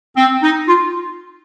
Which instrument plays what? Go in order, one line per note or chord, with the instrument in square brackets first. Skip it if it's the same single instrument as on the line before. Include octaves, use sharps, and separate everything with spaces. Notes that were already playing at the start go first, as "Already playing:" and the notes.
[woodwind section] C4
D#4
F4